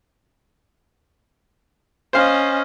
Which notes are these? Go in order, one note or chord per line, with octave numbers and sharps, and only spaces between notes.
C#4 C5 D#5 F5